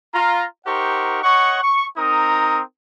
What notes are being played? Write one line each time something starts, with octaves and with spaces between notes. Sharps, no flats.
F4 A#5
D#4 G4 A#4 C5 F#5 C#6
C#5 D#5 F#5 C#6
C#6
C4 D#4 A#4 A#5 D#6